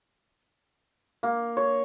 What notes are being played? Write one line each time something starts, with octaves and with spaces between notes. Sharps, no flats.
A#3
C#5